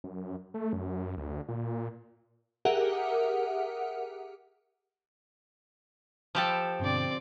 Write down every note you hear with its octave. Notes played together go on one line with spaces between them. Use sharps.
F#2
A3
F#2
D2
A#2
G4 G#4 A#4 E5 F#5
F3 G4 A4 B5
G2 B2 D3 C4 D5